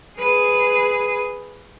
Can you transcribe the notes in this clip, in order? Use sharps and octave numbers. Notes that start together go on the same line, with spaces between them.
G#4 B4